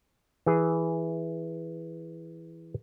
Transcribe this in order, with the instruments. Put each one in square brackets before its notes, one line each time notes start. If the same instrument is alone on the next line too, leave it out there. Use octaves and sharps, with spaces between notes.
[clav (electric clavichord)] E3 G#4